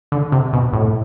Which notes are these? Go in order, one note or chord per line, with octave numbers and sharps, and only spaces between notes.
D3
C3
B2
A2